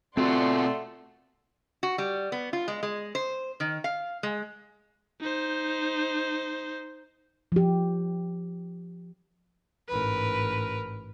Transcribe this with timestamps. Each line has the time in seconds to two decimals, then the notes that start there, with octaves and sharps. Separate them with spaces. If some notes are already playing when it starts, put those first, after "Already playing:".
0.17 B2 A3 C4 F4 F#4 D5 F#5 C6
1.83 F#4
1.98 G3
2.32 B3
2.53 F4
2.68 G#3
2.83 G#3
3.15 C5
3.60 D#3
3.84 F5
4.23 G#3
5.20 D#4 C5
7.52 F3 G4
9.89 A1 G#2 A#4 B4